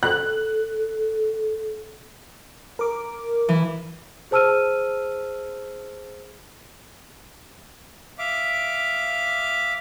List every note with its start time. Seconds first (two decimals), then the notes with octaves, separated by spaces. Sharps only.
0.03 A4 F#6
2.79 A#4 D6
3.49 E3
4.31 G#4 C5 A5 E6 F6 D#7
8.19 E5 F5 D6